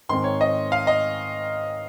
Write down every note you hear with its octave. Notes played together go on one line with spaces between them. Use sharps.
G#2 D#3 G#3 C4 C6
C#5
D#5
F5
D#5